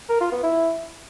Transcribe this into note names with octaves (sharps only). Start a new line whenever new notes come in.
A#4
F4
B3
E4